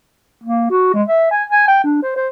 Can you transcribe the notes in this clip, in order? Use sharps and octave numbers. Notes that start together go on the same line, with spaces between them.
A#3
F#4
G#3
E5
G#5
G#5
G5
D4
C5
C5